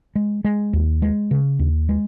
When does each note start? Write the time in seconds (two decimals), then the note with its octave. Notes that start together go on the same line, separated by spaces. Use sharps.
0.16 G#3
0.44 G#3
0.73 D#2
1.02 G#3
1.31 C#3
1.59 D#2
1.89 G#3